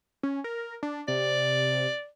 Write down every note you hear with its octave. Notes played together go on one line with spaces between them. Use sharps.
C#4
A#4
D4
C3 D5